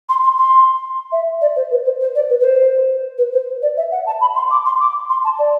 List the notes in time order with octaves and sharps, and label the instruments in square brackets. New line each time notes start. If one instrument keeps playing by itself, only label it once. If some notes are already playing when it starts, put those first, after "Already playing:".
[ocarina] C6
C6
C6
E5
D5
C5
B4
C5
C5
D5
B4
B4
C5
B4
C5
D5
E5
F#5
A5
B5
C6
D6
C6
D6
C6
A5
D5